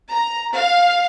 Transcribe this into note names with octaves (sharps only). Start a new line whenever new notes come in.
A#5
F5